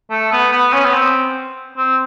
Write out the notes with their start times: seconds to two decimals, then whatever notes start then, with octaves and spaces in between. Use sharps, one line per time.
0.10 A3
0.32 B3
0.52 B3
0.73 C#4
0.85 B3
0.93 C4
1.77 C4